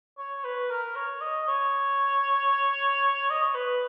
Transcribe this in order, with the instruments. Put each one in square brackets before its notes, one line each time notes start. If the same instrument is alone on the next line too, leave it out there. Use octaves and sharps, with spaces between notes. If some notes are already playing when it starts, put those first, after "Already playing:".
[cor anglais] C#5
B4
A#4
C#5
D#5
C#5
D#5
C#5
B4